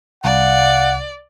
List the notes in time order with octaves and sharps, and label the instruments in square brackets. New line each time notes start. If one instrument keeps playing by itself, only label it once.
[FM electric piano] C2 [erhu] D5 [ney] F5 [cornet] F#5